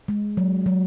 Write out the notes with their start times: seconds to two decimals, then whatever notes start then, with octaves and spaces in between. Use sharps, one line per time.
0.08 G#3
0.37 F#3
0.66 F#3